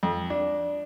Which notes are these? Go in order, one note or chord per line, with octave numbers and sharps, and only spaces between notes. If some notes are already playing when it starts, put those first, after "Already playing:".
F2
D4